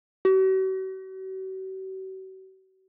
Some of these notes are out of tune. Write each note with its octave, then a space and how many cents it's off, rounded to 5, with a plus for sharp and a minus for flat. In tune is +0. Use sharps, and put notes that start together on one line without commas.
F#4 +45